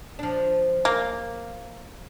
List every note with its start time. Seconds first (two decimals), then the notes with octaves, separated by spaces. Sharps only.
0.19 F3 D4
0.85 A#3 A#4